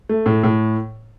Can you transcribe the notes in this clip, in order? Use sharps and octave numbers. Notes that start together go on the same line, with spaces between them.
A3
A2
A2